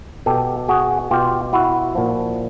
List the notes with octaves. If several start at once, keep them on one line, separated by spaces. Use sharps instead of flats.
B2 G4 A4
F#4 G#4
B2 F4 G4
E4 F#4
A#2 F3